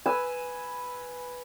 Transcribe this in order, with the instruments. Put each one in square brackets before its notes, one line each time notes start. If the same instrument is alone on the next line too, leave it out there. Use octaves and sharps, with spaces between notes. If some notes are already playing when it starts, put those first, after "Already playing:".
[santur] B4 G#5 E6